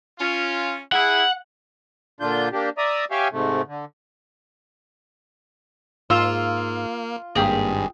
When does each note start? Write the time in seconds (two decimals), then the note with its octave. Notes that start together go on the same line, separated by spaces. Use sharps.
0.19 C#4 F4
0.92 E4 G#4 F#5
2.21 A#2 D3 D4 F4 G6
2.53 A#3 D4 G4
2.78 D5 E5 A#5 D#6
3.11 G4 C#5 E5 F5 G5 G#5
3.32 G#2 C3 A3
3.67 D3
6.10 G#2 A#3 F4 E6
7.35 G#1 G2 A#3 G4 G#4